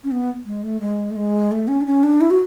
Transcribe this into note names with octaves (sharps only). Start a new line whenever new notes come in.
C#4
B3
G#3
A3
G#3
A3
G#3
A3
C#4
D4
C#4
D4
E4
F#4